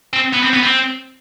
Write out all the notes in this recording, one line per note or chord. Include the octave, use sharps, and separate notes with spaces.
C4
B3
C4
B3
C4